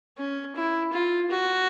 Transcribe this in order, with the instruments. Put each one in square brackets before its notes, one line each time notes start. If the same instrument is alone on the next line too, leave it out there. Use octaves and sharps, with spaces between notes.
[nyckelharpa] C#4
E4
F4
F#4